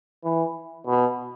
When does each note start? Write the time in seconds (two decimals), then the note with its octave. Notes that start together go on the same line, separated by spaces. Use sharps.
0.24 E3
0.87 B2